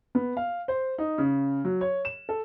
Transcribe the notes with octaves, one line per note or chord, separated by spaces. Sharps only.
B3
F5
C5
D#4
C#3
F#3
C#5
E7
A4